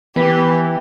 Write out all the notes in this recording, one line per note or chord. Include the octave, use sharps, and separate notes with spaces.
E3 B3 G4 B4 B6